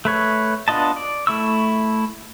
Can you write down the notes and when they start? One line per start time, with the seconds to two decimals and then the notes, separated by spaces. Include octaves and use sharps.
0.05 A3 B4 C#5
0.68 B3 D4 F4 D#5 A5
0.96 D5
1.27 A3 E4 C#6 E6